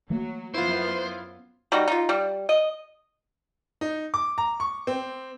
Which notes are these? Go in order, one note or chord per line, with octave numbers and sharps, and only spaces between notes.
E3 F#3 A3 A#3
F#2 B3 E4 F4 C5
G3 D#4 F#4
D#4 F4
G3
D#5
D#4
D6
A#5
C#6
C4